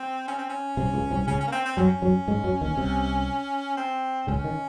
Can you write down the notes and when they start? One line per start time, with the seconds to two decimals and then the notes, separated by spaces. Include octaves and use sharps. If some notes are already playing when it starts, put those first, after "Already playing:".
Already playing: C4
0.28 C#4
0.38 C4
0.49 C#4
0.77 C2 C3
0.94 C#2 C#3
1.10 C2 C3
1.27 C#2 C#3 C#4
1.41 C#4
1.47 A#3
1.52 C4
1.65 C4
1.77 F#2 F#3 C#4
2.02 F#2 F#3
2.28 G#2 G#3
2.44 F#2 F#3
2.61 D#2 D#3
2.77 C2 C3
3.77 C4
4.27 C#2 C#3 C#4
4.44 D#3